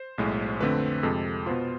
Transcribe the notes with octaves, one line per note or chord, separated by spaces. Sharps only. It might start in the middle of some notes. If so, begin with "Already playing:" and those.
Already playing: C5
B1 A2 G#3
F2 D3 A3 C4 B4
F2 C3 G#3 A4
B2 B3 F4 C5